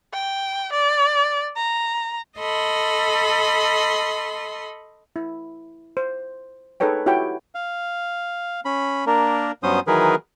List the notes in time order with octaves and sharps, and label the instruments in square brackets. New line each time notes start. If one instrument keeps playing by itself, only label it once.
[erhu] G5
D5
A#5
[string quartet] A4 D#5 B5 C6
[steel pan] E4
C5
D#4 G#4 A4 B4 C#5 G5
E4 F#4 G4 C#5 G5
[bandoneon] F5
C#4 B5
A#3 D4 A#4
G2 F#3 B3 C#4 C5 D#6
D#3 E3 F#3 G#4 A#4 B4